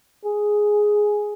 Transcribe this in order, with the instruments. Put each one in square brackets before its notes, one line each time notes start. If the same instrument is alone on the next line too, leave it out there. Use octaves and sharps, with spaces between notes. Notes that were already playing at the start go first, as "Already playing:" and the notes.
[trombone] G#4